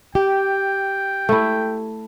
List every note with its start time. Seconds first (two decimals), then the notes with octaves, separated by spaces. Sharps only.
0.15 G4 G5
1.29 A3 E4